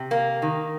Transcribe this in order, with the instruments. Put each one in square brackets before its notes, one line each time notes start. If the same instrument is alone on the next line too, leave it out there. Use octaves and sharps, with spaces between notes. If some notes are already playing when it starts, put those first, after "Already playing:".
Already playing: [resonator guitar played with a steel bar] C3
A#3
D#3